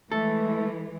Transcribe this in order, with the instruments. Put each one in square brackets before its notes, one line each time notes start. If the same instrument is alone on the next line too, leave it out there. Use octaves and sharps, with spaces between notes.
[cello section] E3 G#3 [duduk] A3 [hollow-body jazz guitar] A4